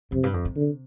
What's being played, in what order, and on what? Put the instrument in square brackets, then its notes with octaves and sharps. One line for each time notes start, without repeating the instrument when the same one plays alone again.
[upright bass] F2 [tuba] C3
[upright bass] G2
F2
C3
[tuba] D3